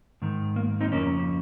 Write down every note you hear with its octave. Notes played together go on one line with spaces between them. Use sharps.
G#2 D#3
A#3
C4 D#4
F2 C#3 A#3 C#4